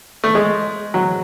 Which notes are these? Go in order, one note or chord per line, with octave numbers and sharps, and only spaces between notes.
A3
G#3
F#3